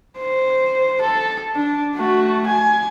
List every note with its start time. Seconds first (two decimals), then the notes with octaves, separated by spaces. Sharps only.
0.18 C5
1.02 A4
1.55 D4
1.95 A3 F#4
2.47 G#5